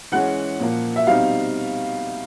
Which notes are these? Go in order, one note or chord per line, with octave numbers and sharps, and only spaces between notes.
E3 G#3 C#4 F#5
A#2 F3 A#3
E5
B2 G3 C4 D#4 F5